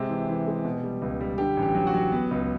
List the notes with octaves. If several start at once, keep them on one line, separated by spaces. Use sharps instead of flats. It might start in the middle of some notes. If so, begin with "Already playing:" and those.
Already playing: C3 G#3 G4
E3
E3
G#3
B2
G3
C#2
G3
D3 G4
A1
G4
F#3
F#4
F#3
B3
C#2